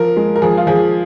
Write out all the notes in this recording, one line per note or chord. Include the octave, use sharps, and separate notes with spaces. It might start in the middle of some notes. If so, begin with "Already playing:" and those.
Already playing: F3 A#4
G#3
A#4
F3 G#4
F4
F3 G#4